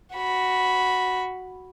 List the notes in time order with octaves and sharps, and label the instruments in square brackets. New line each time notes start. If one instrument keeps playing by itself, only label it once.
[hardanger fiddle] F#4 B5